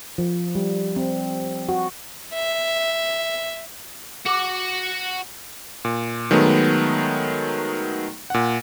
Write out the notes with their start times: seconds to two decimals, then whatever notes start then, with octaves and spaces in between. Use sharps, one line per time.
0.18 F3
0.55 G3
0.96 C4
1.69 F#4
2.33 E5
4.26 F#4 G#4 F#5 D6
5.85 A#2
6.31 D#3 F#3 G#3 A3 B3
8.30 A#2 F#5